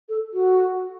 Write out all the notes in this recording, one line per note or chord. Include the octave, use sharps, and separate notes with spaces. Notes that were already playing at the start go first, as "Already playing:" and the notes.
A4
F#4